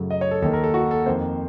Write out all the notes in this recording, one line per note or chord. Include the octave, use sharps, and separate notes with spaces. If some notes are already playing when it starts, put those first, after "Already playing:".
Already playing: F#2 C#3 F#3 A3
D#5
C#5
A4
D#2 D#3 A#3 A4
A#4
A4
F#4
A4
F2 D#3 A#3 C5